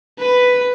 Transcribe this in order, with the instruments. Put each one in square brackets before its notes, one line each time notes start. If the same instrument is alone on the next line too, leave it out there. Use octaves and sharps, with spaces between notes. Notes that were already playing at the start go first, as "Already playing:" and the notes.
[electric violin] B4